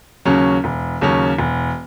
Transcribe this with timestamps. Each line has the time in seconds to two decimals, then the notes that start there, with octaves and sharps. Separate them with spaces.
0.25 D#2 C#3 F#3 C#4
0.64 E1
1.01 D#2 C#3 F#3 C#4
1.38 E1